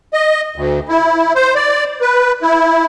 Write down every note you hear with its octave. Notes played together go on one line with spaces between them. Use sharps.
D#5
D2
E4
C5
D5
B4
E4